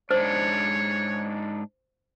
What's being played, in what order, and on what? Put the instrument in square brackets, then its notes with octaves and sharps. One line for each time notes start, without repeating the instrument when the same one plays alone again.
[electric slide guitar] G#2 D4 [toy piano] C5 [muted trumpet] C#5